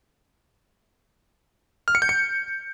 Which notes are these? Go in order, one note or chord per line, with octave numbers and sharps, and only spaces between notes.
F6
C#7
G6
C#7